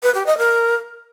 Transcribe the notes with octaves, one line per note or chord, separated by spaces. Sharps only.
B4
G4
D#5
A#4